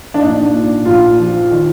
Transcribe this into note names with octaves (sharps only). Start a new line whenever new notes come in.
D4
A#1 D#4
D4
A#2
A#1 F4
F3
D#3